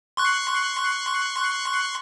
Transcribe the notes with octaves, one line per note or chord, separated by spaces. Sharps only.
C6 C#6 F#6